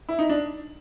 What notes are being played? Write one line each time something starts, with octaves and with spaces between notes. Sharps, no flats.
E4
D#4
D4